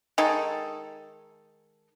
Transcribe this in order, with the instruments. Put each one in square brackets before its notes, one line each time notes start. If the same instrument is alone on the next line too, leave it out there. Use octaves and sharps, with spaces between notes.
[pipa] D#3 G#3 D#4 A4